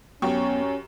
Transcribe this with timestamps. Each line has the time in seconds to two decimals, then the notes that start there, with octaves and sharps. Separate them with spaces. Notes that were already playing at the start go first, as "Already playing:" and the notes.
0.22 F#2 B3 C#4 G4 C#6